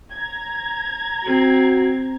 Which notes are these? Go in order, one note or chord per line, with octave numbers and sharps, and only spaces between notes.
A#5 G#6
C4 F#4